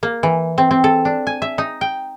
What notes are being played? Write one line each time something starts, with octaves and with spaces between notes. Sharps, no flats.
A#3
E3
C4
C4
A4
D4
G#5
E5
D#4
G5